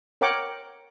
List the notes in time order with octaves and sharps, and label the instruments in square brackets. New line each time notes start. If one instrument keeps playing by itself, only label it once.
[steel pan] A#4 C#5 F#5 G5 D6